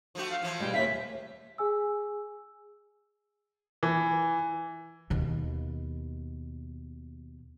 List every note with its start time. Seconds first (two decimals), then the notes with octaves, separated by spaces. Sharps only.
0.15 F3 A3 F#4
0.30 F5
0.43 E3 F3
0.60 B2 G3 G#3 G5
0.74 D#2 E5 F5 B6
1.58 G#4 G#5 E6
3.83 E3
5.10 D#2 B2